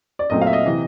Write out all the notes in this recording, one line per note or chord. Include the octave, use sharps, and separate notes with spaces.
D5
A#2 F#3 A3 C4 D#5
F5
E5
D#5
C3 E3